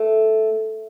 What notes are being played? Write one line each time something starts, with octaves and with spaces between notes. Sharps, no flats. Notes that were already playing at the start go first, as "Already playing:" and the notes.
Already playing: A3